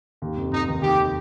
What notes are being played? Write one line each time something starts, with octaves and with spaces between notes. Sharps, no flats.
D#2
F1
F1 D#4
D#3
D#2 G4